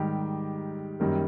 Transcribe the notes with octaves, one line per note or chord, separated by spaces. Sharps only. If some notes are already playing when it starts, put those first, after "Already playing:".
Already playing: G#2 D#3 G3 G4
F#2 D#3 G3 A#3